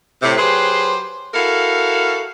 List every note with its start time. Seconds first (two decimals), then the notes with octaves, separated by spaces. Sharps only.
0.23 A2 C3
0.38 F#3 G4 G#4 B4 C5
1.34 E4 F#4 A4 A#4 F5